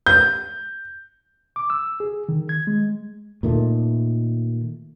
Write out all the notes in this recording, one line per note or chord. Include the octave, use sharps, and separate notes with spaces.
G6
D6
E6
G#4
D#3
G#6
G#3
A#2 D#3 A3